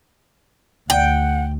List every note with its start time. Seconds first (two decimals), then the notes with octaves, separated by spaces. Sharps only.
0.90 D2 F#5 G5